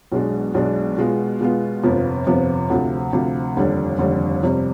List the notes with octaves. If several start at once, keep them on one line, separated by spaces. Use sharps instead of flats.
B1 B2 G#3 D4
B1 B2 G#3 D4
B2 G#3 B3 F4
B2 G#3 B3 F4
G1 F2 C3 F3 B3
G1 F2 C3 F3 B3
D2 C3 F3
D2 C3 F3
F1 D#2 D3 G3 D4
F1 D#2 D3 G3 D4
G1 F2 C3 G3